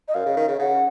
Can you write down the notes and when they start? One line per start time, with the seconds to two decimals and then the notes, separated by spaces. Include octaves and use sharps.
0.08 D#5
0.14 F#2 F5
0.26 C#3
0.36 D#3
0.48 C#3
0.59 C#3 F#5